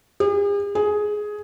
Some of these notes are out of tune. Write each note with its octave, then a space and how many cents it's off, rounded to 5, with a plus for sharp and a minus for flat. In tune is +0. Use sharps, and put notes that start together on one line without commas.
G#4 -45
G#4 +10